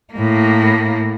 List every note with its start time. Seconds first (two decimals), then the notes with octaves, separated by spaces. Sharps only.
0.14 A2 A#3